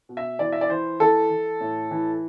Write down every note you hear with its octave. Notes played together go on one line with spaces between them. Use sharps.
B2
E5
E3 D5
E5
D5
E3 C5
E3 A4
E3
A2
E3